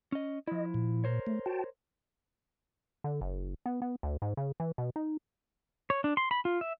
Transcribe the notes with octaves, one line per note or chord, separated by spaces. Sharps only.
C#4 D#5
F3 E4 D#5
A#2
A#4 C5 C#5
A3
F#4 G5 A5
D3
F#1
B3
B3
D2
G#2
C#3
E3
B2
D#4
C#5
D4
C6
B5
F4
E5